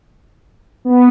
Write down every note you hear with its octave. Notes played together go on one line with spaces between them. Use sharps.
B3